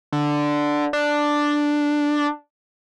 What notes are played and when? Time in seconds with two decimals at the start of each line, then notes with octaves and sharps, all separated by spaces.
0.12 D3
0.93 D4